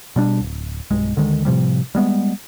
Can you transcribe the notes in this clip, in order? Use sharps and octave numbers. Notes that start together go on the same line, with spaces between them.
B2 G3 D4
D1
B1 G2 G#3
D2 D3 D#3 G#3
A2 C3 F3 G3
G3 G#3 B3